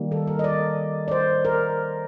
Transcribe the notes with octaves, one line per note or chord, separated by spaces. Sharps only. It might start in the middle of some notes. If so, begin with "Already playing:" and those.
Already playing: D#3 G3 A#3
A4
A#4
D#5
D5
D5
C5
A#4